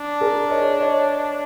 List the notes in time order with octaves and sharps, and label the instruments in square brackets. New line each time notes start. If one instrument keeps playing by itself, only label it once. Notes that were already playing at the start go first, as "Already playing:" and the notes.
Already playing: [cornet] D4
[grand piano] G#4 A#4
C#5 D#5
C#5 D#5